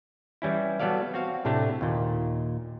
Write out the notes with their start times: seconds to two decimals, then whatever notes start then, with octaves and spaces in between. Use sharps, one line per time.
0.42 E3 G3 C#4 E4
0.80 F#3 G3 B3 A4 D5 F5
1.14 C4 F#4 F5
1.45 A2 C3 A3 D4 G4
1.81 D#2 A#2